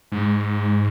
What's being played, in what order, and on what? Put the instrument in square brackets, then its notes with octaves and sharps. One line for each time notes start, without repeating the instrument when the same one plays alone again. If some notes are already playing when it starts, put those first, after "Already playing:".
[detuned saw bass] G#2